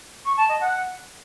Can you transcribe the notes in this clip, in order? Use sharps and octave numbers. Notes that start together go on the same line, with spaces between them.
C#6
A5
D#5
F#5